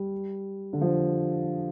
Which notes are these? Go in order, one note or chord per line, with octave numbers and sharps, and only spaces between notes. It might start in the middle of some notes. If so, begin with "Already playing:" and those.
Already playing: G3
D3
F3